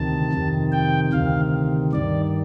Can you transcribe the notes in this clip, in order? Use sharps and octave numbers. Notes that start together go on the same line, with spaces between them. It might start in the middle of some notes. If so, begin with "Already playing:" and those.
Already playing: D2 C3 D#3 A5
F2 C3 D#3
G5
D2 C3 D#3 F5
G2 D#3 D5